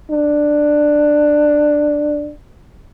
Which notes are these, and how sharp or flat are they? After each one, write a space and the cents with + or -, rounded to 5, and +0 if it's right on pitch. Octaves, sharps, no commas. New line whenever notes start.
D4 +10